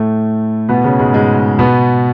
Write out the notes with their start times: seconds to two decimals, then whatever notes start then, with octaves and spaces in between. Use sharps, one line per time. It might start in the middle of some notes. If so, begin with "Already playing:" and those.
Already playing: A2 A3
0.69 B2 B3
0.84 C#3 C#4
0.99 G#2 G#3
1.14 G#2 G#3
1.59 B2 B3